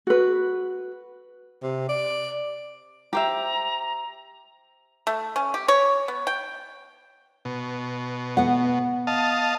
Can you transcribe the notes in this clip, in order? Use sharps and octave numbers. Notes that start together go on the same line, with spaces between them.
F#4 B4
C3
D5
G4 C5 E5 A#5
A3
C#4
G4
C#5
B3
G5
B2
B3 F#5
D#5 F5 A5